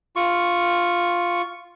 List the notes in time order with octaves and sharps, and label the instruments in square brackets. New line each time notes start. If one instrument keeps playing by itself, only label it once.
[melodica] F4 C#6